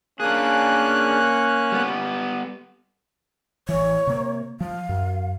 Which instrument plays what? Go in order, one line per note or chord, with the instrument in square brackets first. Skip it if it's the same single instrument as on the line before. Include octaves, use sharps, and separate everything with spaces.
[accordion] A#3 F#6 [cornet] C#4 [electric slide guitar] D4 G#4
[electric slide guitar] G3 B3
[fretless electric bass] A1 E3 [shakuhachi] C#5
[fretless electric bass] C3 A#3
[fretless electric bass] F3 [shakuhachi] F5
[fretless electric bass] F#2